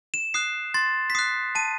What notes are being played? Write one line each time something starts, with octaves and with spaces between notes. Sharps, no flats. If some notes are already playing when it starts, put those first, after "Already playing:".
E7
D#6 F#6 C7
C6 A6
B6
D#6 F#6 C7
A5 D#7